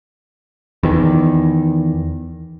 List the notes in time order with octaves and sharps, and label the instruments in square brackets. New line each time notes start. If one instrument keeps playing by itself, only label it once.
[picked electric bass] E2 D#3